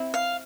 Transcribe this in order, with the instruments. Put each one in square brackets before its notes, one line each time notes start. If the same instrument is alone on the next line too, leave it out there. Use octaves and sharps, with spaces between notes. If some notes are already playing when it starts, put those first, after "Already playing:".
Already playing: [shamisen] C4 E4
[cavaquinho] F5